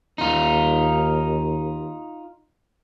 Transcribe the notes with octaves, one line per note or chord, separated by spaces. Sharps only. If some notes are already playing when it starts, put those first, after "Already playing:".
D#2 D#4 F4